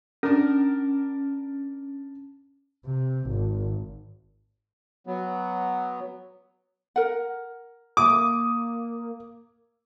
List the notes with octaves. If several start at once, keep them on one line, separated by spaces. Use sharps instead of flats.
C#4 D4 A#4
C3
G#1
F#3 B3
A#4 F#5
A#3 D6 D#6